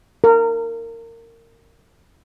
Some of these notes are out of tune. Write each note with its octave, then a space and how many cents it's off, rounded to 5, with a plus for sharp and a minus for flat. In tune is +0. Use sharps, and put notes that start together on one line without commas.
A#4 -25